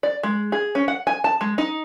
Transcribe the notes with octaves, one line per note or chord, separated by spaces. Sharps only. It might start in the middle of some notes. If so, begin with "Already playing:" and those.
D5
G#3
G#4
C#4
F#5
G#5
A5
G#3
D#4